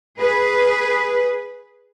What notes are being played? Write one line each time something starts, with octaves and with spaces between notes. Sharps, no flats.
G#4 B4